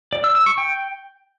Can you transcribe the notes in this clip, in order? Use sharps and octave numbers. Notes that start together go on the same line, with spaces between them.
D5
E6
E6
C#6
G5